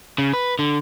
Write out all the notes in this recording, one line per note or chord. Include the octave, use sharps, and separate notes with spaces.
C#3
B4
D3